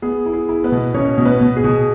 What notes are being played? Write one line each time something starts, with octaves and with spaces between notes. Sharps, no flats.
B3 G#4
E4
G#4
E4
B3 B4
B2
B2 C#4 C#5
B2
B3 B4
B2
G#4
B2